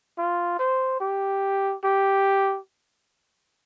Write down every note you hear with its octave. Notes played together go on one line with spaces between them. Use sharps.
F4
C5
G4
G4